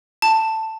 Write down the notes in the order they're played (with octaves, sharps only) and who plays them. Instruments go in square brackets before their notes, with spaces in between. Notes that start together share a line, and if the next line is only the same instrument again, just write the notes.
[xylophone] A5